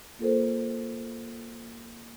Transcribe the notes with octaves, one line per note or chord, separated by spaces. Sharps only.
A#3 F4 A4 A#4 C5